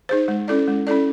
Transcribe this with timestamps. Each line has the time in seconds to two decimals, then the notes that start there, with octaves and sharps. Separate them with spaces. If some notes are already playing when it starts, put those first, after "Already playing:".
0.09 D#4 G#4 C5
0.28 G#3
0.48 C#4 E4 A4 D5
0.68 G#3
0.87 C#4 E4 A4 D5